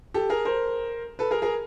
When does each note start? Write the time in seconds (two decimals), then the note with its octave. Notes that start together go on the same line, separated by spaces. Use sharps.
0.14 G4 A4
0.30 G#4 A#4
0.45 A#4 C5
1.19 A4 B4
1.31 G#4 A#4
1.42 G#4 A#4